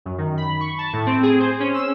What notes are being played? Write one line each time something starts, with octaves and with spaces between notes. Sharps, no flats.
F#2
D#3
B5
C#6
A5
A2
C4
G#4
C5
C#4
E6